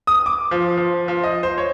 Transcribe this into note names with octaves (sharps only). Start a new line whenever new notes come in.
D#6
D6
F3
F3
F3
D#5
C5
C#5